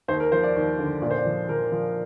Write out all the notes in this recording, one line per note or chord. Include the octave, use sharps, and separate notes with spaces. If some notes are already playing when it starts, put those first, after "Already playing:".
D#2 C5
A#4
F3 C5
D5
D#2
D3
A#2 D5
C5
D5
F3
F3 A#4
F3